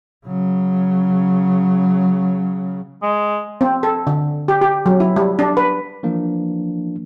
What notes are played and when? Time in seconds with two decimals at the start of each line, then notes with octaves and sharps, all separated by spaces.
0.26 C#3 F#3
3.02 G#3
3.61 C4
3.83 A4
4.07 D3
4.48 G4
4.62 G4
4.86 F#3
5.00 E4
5.16 G3
5.39 D4
5.57 B4
6.03 E3 F3 A#3 D4